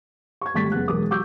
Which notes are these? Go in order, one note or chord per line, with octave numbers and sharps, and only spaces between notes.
C#6 G#6
G#1 G3 A3 C#6 A6 B6
F#1 B3 G#4 F#6
E1 B1 G#3 A#4 D6 D#6
F#3 C#6 D6 E6 G6